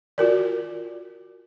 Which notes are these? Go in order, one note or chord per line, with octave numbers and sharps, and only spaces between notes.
F4 F#4 A#4 D5